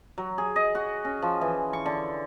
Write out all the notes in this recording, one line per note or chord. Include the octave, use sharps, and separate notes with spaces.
F#3
G#4
D#5
F#4
C#4
F3
E3
C#6
D3